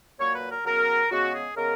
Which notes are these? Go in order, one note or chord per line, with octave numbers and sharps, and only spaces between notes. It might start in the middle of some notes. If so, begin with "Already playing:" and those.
A#2 F#3 A#3 C#5
B4
A#4
C#3 F#3 B3 A#4
C#3 G#3 B3 F#4
G#4
C#3 G#3 B3 A#4